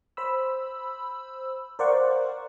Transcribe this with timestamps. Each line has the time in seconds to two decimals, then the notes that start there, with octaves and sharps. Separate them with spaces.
0.17 C5 B5 E6
1.79 A#4 C5 D5 F5 F#5 C#6